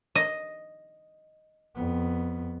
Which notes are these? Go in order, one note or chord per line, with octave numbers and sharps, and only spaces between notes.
D#5
F2 B3